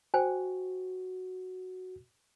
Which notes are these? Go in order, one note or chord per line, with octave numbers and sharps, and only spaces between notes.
F#4 C5 G5 G#5